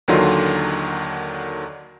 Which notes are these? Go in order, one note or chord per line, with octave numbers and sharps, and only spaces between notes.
D#2 D3 D#3 F#3 F4 C6